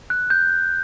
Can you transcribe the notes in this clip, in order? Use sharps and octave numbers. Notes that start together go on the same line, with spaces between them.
F#6
G6